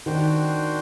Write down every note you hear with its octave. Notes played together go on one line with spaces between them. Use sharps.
D#3 D4 F#4 C5 G5